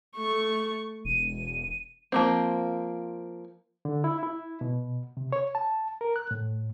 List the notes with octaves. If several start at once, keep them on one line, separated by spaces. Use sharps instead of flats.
A3 C#6
E1 D#7
F3 A#3 C4
D3
E4
E4
B2
C3
C#5
A5
A#4
F#6
A2